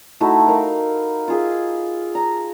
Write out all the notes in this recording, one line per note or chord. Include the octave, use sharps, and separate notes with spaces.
A3 D#4 E4 F#4
A#4 F5
F4 G#4 E5
A#5